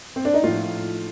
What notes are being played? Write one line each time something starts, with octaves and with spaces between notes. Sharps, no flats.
C4
D4
D#4
A2 F3 F4